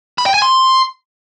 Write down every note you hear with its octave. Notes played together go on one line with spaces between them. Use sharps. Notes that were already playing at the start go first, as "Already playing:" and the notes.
B5
G5
G#5
C6